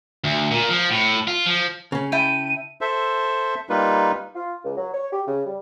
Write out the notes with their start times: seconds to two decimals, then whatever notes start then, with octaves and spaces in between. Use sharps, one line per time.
0.24 D2
0.51 A#2
0.70 F3
0.90 A2
1.27 F4
1.46 F3
1.92 C#3 C#4
2.12 E4 G5 A5 D#7
2.81 A4 C5 E5
3.69 G3 A#3 D#4 F4 B4
4.36 F4
4.64 C#2
4.77 F#3
4.94 C#5
5.13 G4
5.27 C#3
5.46 G3